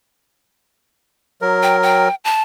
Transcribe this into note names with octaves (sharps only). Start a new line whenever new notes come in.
F#3 A#4
G5
G5
A5